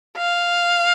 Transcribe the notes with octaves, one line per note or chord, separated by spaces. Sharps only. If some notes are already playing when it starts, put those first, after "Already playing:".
F5